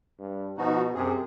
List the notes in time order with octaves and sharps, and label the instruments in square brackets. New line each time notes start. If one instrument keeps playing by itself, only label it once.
[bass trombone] G2
[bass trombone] B2 [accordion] F3 D#4 F#4
[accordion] F#2 G#4 [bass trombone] C3